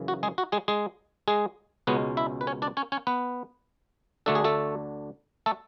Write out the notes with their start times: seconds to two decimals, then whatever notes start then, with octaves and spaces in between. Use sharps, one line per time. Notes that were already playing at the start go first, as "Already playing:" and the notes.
Already playing: F#2 C#3 E3
0.08 F#4
0.23 G#3 G#4
0.38 F#4
0.52 G#3 G#4
0.68 G#3 G#4
1.28 G#3 G#4
1.87 C#2 B2 G#3 B3 C#4 B4
2.17 E4 E5
2.41 B4
2.47 C#4 C#5
2.62 D4 D5
2.77 C#4 C#5
2.92 C#4 C#5
3.07 B3 B4
4.26 D2 D3 A3 D4 A4
4.35 G#4
4.44 A3 A4
5.46 A3 A4